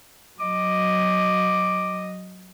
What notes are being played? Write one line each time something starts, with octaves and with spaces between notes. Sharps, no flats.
F#3 D#5 D6